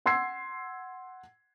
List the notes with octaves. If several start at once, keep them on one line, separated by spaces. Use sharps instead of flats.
F#5 C6 E6 G#6 C7